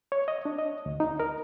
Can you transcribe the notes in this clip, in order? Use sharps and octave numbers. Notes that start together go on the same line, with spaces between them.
C#5
D#5
D4
D#5
D2
D#4
A#4